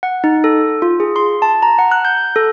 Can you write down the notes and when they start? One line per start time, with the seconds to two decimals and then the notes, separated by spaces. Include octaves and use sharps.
0.03 F#5
0.24 D#4
0.44 A4
0.82 F4
1.00 G#4
1.16 C6
1.42 A5
1.63 A#5
1.79 F#5
1.92 F#6
2.05 G6
2.36 A4